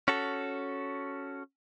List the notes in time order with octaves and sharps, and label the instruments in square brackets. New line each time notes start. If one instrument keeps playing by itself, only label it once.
[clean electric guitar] C#4 F#4 A4